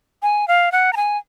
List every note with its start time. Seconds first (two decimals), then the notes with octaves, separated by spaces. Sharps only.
0.23 G#5
0.48 F5
0.72 F#5
0.93 A#5
0.97 G#5